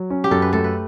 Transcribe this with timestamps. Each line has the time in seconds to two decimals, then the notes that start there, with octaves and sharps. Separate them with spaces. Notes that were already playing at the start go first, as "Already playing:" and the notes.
Already playing: F#3
0.10 C#4
0.24 G4
0.31 F#2 A4
0.42 B4
0.53 A3 A4
0.64 B4